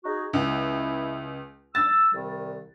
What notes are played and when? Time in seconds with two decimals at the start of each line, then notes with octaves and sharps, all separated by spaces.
0.04 D#4 F#4 G#4
0.33 C#2 E4
1.75 E6 A6
2.12 C2 D#3 G3